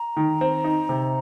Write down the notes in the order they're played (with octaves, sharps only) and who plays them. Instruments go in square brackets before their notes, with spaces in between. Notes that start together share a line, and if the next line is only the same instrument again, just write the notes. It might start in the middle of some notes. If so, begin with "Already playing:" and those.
Already playing: [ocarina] A#5
[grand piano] D#3
C4
D#4
C3